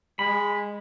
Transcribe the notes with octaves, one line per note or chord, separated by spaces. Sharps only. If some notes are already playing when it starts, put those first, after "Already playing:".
G#3 B5